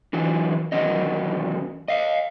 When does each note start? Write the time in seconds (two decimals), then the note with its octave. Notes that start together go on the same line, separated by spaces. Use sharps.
0.13 D3 E3 F#3
0.72 E2 D#3 F#3 C#4 D#5
1.88 D#5 F5